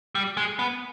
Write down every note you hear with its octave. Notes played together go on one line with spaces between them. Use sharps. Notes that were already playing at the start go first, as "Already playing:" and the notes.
G3
G#3
B3